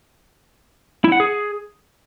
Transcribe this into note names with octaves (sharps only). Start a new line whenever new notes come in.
E4
F#5
G#4